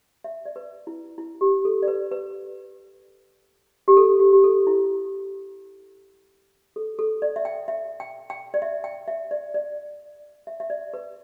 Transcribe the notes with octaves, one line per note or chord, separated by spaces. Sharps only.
E5
D5
B4
E4
E4
G4
A4
D5
B4
B4
G4
A4
G4
G4
A4
E4
A4
A4
D5
E5
G5
E5
G5
G5
D5
E5
G5
E5
D5
D5
E5
E5
D5
B4